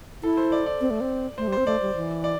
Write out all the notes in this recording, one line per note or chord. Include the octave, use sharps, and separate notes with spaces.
E4 A4
C5
D5
D5
C4
A3
C4
A3 C5
G3
C4 C5
A3 D5
G3
E3
D5